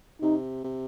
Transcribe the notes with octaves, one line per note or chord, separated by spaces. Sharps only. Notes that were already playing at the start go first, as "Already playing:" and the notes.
C3 D#4
C3